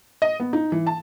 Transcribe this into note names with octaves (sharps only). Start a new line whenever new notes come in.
D#5
B3
D#4
E3
A5